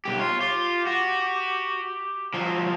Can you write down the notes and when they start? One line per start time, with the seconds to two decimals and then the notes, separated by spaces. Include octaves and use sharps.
0.05 B1 G4
0.19 F4 C#5
0.41 F4 G4
0.87 F#4
2.34 F3 F#3